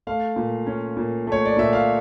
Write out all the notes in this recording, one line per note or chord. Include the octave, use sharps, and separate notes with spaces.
A3 F5
A#2
C#4
A#2
A3 C#5
D5
A#2 E5
F5